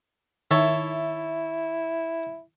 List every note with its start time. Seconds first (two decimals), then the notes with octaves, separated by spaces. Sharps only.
0.51 D#3 E4 A4 C#5 E5